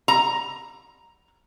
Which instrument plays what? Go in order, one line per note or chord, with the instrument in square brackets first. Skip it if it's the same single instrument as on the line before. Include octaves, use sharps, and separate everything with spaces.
[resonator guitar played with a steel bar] A#5